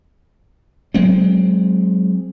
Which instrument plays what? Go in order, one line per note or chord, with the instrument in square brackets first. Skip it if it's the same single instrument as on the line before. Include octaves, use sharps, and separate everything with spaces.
[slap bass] F#3 G#3 C4